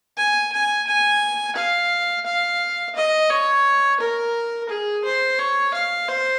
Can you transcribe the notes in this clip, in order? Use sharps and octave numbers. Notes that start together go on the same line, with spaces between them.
G#5
G#5
G#5
F5
F5
D#5
C#5
A#4
G#4
C5
C#5
F5
C5